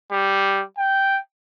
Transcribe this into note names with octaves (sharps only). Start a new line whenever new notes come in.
G3
G5